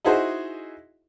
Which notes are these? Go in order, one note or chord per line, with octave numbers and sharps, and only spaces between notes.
D#4 E4 F#4 G#4 C5